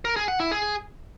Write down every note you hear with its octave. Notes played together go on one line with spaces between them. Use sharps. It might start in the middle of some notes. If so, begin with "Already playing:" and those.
A#4
G#4
F#5
E4
G#4